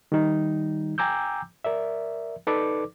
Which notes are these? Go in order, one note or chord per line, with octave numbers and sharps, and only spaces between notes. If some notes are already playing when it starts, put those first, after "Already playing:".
D#3 G3 D#4
G5 G#5 A#5 D6 E6 G6
A#4 D5 E5
D#4 A4 B4 D5 D6